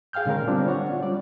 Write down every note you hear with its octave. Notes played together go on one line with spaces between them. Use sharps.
G#4 F5 G5 F6 G6
A#2 D3 G#3 C#4 A#4
G3 B3 C4 D4 F4
C#5 D5 F#5
C#4 F4
G3 D5